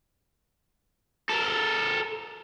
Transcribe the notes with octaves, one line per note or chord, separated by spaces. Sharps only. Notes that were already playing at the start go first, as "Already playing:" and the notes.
A4 A#4